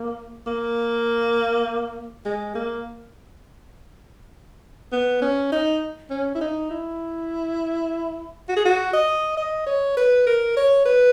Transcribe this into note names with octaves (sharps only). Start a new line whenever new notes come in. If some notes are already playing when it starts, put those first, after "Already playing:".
Already playing: A#3
A#3
G#3
A#3
B3
C#4
D#4
C#4
E4
D#4
E4
F#4
G#4
F#4
D#5
D#5
C#5
B4
A#4
C#5
B4